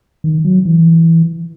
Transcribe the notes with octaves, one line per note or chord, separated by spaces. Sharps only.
D#3
F#3
E3